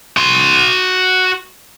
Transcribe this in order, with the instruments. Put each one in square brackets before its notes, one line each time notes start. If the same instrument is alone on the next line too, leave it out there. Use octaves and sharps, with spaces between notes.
[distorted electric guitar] F#4 C6